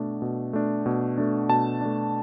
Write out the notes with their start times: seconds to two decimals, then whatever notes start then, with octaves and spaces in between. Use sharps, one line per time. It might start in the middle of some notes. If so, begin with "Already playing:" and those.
Already playing: B2 A3 D4
0.22 B2
0.53 A3 D4
0.86 B2
1.18 A3 D4
1.49 B2 A5
1.81 A3 D4